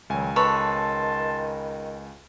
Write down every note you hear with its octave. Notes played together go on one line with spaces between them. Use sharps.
C#2 D#3 F#3 G3 G#5
D#3 A4 B4 C#5 A5 C6